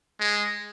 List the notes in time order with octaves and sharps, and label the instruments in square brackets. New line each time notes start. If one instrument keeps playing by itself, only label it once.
[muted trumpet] G#3